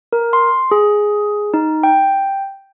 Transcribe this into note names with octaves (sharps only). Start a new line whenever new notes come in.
A#4
C6
G#4
D#4
G5